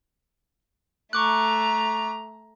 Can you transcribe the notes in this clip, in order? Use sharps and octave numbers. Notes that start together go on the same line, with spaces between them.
A3 A#5 C#6 D6 F#6